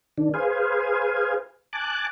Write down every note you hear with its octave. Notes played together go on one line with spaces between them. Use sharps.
D#3 D4
G#4 B4 C5 F5 G#5
G#5 A5 D6 F#6